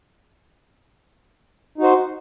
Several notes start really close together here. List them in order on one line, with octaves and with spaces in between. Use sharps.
D#4 F#4 C5